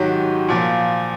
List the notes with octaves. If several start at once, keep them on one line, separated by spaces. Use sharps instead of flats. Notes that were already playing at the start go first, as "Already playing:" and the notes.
Already playing: G#2 D#3 F#3 F#4 G4
A#2 F3